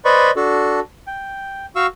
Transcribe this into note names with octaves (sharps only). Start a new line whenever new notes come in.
B4 C5 D5 D#5 B5 C#6
D4 F#4 A4
G5
F#4 F5 C#6 E6